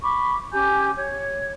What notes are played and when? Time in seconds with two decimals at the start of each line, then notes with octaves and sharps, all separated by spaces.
0.03 B5 C#6 D6
0.52 C#4 G4 G#5 G6
0.95 C#5